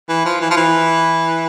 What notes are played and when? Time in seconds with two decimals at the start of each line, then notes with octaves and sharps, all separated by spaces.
0.09 E3
0.25 F3
0.41 E3
0.51 F3
0.57 E3